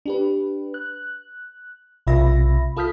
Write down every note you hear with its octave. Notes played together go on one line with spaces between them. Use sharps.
D4 G4 B4
F#6
B1 C3 F4 E5 B5 A#6
F4 A4 D#6 F6 G6 B6